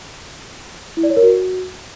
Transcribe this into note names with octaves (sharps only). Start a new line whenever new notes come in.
E4
D5
C#5
A#4
F#4